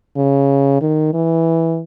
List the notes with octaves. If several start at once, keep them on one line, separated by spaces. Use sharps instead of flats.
C#3
D#3
E3